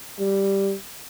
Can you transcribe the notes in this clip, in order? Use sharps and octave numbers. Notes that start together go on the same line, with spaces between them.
G3